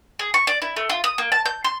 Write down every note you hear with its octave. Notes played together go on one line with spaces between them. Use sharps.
G#4
C#6
D5
E4
A3
F4
D#6
A#3
A5
G6
C6